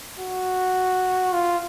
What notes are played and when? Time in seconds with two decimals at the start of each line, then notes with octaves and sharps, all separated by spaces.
0.19 F#4
1.33 F4